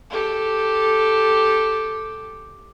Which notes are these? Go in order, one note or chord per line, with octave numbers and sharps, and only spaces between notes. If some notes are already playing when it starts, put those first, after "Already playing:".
G4 A4